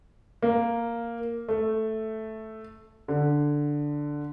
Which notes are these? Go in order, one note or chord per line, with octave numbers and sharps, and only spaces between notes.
A#3
A3
D3